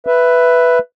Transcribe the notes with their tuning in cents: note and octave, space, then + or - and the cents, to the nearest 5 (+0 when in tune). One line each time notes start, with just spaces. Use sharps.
B4 +0 E5 +10